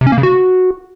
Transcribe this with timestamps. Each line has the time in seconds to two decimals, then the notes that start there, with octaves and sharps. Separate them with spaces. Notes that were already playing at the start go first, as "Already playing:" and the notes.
0.01 C3
0.07 C#4
0.12 A#3
0.18 C#3
0.23 F#4